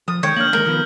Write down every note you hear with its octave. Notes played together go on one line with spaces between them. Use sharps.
F3 D#6
D#3 G#3 C#5 G5 G6
A#3 D4 F6 G6 F#7
D#3 G#3 A#4
D#3 F3 B3 F6